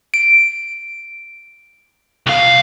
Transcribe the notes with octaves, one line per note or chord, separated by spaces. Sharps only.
D7
C2 F5